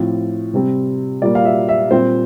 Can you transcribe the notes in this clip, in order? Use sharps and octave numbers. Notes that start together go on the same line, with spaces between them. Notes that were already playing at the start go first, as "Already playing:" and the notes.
Already playing: A2 F3 C4
C3 G3 C4
A#2 G3 A#3 D5
F5
E5
E5
A#2 G3 C4 C5